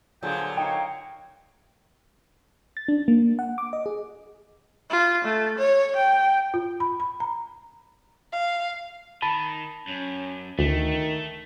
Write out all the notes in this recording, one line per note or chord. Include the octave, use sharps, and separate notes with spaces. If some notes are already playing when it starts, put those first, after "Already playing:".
A#2 D3 F3 F#3 G#4 G5
D#4 C#5 F5 G5
A6
D4
A#3
F#5
D6
D#5
G#4
F4
A3
C#5
G5
F4
B5
B5
A#5
F5
D#3 A5 B5
F#2 C#4
D2 D#3 A3